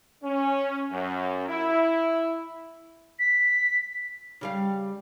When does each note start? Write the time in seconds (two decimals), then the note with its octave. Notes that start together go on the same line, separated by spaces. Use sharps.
0.22 C#4
0.91 F#2
1.49 E4
3.19 B6
4.41 C#3 G3 F5